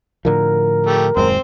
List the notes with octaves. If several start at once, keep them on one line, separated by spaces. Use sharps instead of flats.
A2 D3 F3 A#4
A3 G4
D#1 F#2 G#3 C4 C5